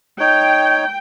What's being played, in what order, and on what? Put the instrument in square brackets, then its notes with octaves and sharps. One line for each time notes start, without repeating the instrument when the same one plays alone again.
[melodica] D#4 C#5 [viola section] G5